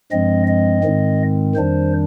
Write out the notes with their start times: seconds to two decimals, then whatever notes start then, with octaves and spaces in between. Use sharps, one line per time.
0.12 G2 F3 G#3 C4 D#5
0.48 D#5
0.84 G#2 D#3 G#3 C4
1.55 F2 D#3 G3 D4 C5